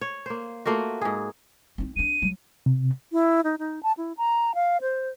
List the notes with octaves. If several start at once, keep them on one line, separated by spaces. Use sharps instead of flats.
C#5
A#3 C5
A3 A#3 F4 F#4
G#2 G#4
C4 D#4
C4 D4 D#7
F#3
C3
E4
D#4
D#4
A5
E4
A#5
F5
C5